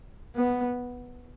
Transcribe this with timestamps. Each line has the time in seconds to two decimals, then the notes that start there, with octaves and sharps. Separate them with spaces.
0.36 B3